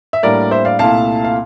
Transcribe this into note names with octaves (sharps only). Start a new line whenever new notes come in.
E5
A2 G3 A#3 D4 A#4 D5
C5 E5
D5 F5
C2 A#2 A3 E4 F5 A5
F5